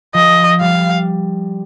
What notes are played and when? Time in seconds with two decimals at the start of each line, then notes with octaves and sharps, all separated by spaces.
0.14 F3 D#5
0.61 G3 F5